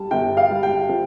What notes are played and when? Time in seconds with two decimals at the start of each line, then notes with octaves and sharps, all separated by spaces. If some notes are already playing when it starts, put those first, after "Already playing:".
Already playing: G3 A5
0.11 G1 G5
0.37 F5
0.50 G3
0.63 G5
0.89 F3